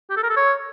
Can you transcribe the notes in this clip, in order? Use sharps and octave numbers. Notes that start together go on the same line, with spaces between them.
G4
A4
A#4
A4
C#5